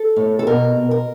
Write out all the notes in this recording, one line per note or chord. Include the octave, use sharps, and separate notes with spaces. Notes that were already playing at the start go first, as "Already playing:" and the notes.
Already playing: A4
A2
A4
B2 A#4
B2
A#4